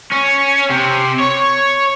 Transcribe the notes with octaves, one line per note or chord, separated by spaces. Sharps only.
C#4
C3
C#5